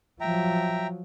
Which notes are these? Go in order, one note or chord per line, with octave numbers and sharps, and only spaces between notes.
F3 F#3 E5 G5 A#5